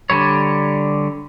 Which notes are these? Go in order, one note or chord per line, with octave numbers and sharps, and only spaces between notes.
D3 G3 C#5